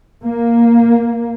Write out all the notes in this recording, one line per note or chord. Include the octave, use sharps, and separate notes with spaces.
A#3